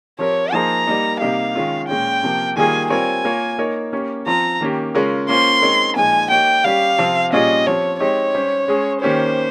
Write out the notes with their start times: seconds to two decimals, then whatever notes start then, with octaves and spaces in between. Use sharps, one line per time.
0.19 F3 C4 G4 A#4 C#5
0.52 F3 A#3 D#4 G#4 C5 A#5
0.87 G3 A#3 D#4
1.20 C3 G3 A#3 D#4 G4 F5
1.55 D#3 G#3 C#4 F4
1.88 A#2 G#3 C#4 G5
2.23 C3 F3 A#3
2.56 D#3 G3 A#3 F4 G#4 G#5
2.90 G3 C4 F4 A#4 C#5 G#5
3.25 A#3 F4 A#4 C#5
3.58 A#3 D#4 A#4 C#5
3.93 A#3 C#4 G4 C#5
4.26 F3 C4 F4 A#5
4.61 D#3 A#3 C#4 G4
4.95 C#3 G#3 C#4 F4 A#4
5.29 A#3 C#4 F4 C5 C6
5.62 G#3 C4 D#4 A#4 C#5
5.96 A#2 F3 G#3 D#4 G#5
6.30 A#3 D#4 G4 C#5 G5
6.64 G3 C#4 G4 F5
6.98 C3 F3 C4
7.33 A#2 G3 C#4 F4 G#4 D#5
7.66 F3 C4 G4 C#5
8.00 G#3 C4 D#4 G4 C#5
8.35 G3 C#4 G4 C5
8.68 G#3 C#4 G#4
9.02 D#3 A#3 C#4 G4 C5 C#5